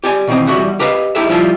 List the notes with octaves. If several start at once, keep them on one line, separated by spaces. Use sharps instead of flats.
G4 D5 G#5
B2 D#3 E3 A3 C4 D#5
E2 G3 F#4 E5 F#5
G4 A#4 B4 D#5 F5
D#4 E4 G4 A4 E5
D2 F3 G3 E4 F4 E5